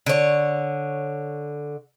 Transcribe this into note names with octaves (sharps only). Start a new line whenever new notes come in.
D3 C#5